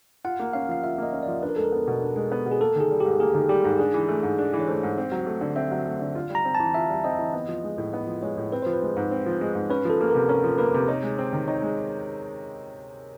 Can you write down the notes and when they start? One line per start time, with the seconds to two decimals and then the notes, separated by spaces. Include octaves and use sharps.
0.25 F4 F#5
0.40 A#3
0.53 C#4 F5
0.69 F3 F5
0.83 F4 E5
0.98 A#3 D#5
1.12 C#4
1.23 D5
1.28 F3
1.42 D4 B4
1.49 A#4
1.56 G#3 A4
1.64 A#4
1.72 B3
1.87 B2
2.02 D4
2.16 G#3
2.32 B3
2.46 B2
2.51 G#4
2.60 A#3 A4
2.76 D#3 G#4
2.91 G3
3.00 G#2 G4
3.19 A#3 G#4
3.35 D#3
3.49 G3 G4
3.64 G#2
3.79 D4 G#4
3.94 E3
4.09 A3
4.23 G#2
4.38 D4 G#4
4.53 E3
4.60 C#5
4.68 A3 C5
4.83 G#2
4.97 C4
5.12 F#3
5.27 A3
5.41 D3
5.56 C4 E5
5.71 F#3
5.85 A3
6.01 D3
6.15 F4
6.30 G3
6.35 A#5
6.45 C4
6.55 A5
6.60 E3
6.74 F4 E5
6.89 G3
7.04 C4 D#5
7.19 E3
7.33 B3
7.49 F3
7.64 G#3
7.78 A2
7.93 B3 D#5
8.07 F3
8.22 G#3 C#5
8.38 A2
8.52 C4 B4
8.62 F3 C5
8.73 B4
8.82 G#3
8.97 G#2
9.11 C4
9.26 F3
9.41 G#3
9.55 G#2
9.70 C#4 B4
9.85 F3 A4
10.00 A#3
10.10 C3 A#4
10.29 C#4 A#4
10.44 F3
10.58 A#3 B4
10.74 C3
10.88 D#4 C#5
11.03 G#3
11.18 C4
11.33 D#3
11.48 D#4 C#5
11.62 G#3